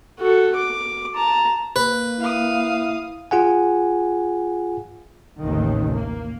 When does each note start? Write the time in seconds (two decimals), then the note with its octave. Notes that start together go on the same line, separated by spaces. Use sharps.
0.20 F#4 A4
0.56 D6
1.15 A5 A#5
1.76 A#3 B4
2.20 E4 F5 D#6
3.31 F4 G#4 F#5 G#5
5.41 A1 D#2 C3 D#3
5.93 A#3